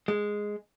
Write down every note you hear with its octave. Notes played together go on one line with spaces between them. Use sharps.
G#3